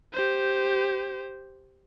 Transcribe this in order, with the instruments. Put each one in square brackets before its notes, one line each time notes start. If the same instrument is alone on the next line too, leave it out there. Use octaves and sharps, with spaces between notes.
[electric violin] G4 C5